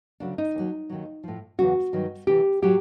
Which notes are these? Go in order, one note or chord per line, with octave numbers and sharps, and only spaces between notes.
D2 C#3 F#3 D4
D#4
D#2 D#3 F#3
D#2 D#3 F#3
A2 F3
E2 C#3 F#3 F#4
G2 D#3 F#3
D2 C3 E3 G4
A2 F#3 G4